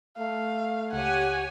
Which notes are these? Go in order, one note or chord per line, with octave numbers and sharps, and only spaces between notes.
A3 F5
C#2 G4 C#5 F#5 G#5